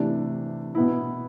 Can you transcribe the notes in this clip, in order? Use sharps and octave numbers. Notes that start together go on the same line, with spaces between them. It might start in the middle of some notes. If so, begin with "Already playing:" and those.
Already playing: C3 E3 A3 D4
B2 B3 E4